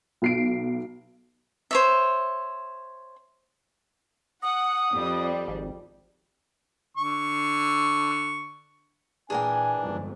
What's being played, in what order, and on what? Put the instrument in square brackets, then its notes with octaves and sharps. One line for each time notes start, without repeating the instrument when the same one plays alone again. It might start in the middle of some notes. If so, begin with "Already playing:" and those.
[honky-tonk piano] B1 C7 D7
[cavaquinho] C5 C#5 E5
[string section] F#5 [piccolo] D#6
[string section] F2 G3
[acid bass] G#1
[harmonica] D3 C#6
[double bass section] A#2 [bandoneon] E3 D4 [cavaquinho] G#4 A#4 G5 [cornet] G#5
[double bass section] G1 F2 G#2